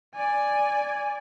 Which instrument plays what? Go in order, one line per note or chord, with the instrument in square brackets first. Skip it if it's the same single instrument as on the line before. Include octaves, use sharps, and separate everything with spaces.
[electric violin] D5 G#5